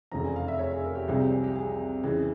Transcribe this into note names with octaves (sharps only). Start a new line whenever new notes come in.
F1 E2 C#3 F3 A#5
G#5
F5
E5
C#5
G#4
A#4
G4
C2 C3 F3 G#3
G4
G#4
G4
G#4
F2 C#3 E3 G#3